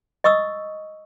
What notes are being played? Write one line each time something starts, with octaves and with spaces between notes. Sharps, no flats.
D#5 C#6 D#6 E6